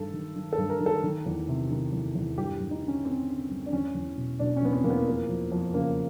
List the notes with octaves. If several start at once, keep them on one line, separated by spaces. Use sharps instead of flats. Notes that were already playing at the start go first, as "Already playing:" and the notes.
Already playing: G2 D#3 A4
D#3
D#3
A4
G2
A#4
D#3
A4
D#3
E2
C3
D#3
E2
E2
G2 G4
G2
D#4
D3
C#4
D3 C4
D3
G2
D4
E2 C#4
E2
B2
B2 D4
C#4
E2 B3
C4
E2 A#3
B3
F2 A#3
F2
F2
C#3 A#3